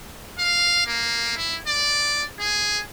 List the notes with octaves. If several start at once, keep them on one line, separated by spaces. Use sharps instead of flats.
F5
A#3
E4
D5
G#4